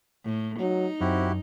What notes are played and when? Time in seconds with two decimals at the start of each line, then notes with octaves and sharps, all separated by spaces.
0.25 A2
0.60 F#3 D#4
1.01 F#2 C4 E4 F#4 G4